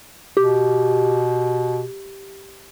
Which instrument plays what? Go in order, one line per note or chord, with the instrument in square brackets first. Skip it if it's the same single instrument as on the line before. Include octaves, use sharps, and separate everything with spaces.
[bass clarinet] B2 [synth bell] G4